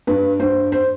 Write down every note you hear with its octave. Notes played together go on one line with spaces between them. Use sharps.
G2 B4
G2 C5
C5